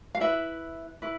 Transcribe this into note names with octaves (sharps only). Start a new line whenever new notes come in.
F5
E4 B4 E5
E4 B4